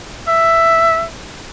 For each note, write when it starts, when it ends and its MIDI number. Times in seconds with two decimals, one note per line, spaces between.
0.27 1.04 76